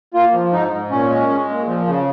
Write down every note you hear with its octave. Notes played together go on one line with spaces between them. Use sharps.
A#3 F4
F3
G#2 D#4
G#2
A#2 C#4
G#3
G#3
A#2
F3
C#3